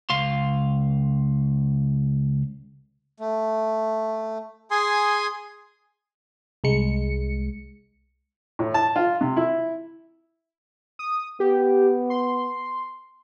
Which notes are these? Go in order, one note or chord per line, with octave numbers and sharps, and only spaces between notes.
C#2 F5 C6
A3
G#4 G#5 C6 D#6
C2 G#3 C#7
A2
A5
F4
C3
E4
D#6
B3 G4
C6